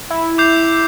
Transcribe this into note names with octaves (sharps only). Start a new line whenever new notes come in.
E4
D6 G6 C7 F7